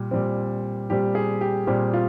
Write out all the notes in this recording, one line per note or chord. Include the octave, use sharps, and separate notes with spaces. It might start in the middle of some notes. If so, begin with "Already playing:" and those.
Already playing: A#2 G3
A#2 G3 C4
A#2 G3 C4 G4
G#4
G4
A#2 G3 C4 G4
F4